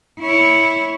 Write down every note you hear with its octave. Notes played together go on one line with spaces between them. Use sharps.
E4 C#5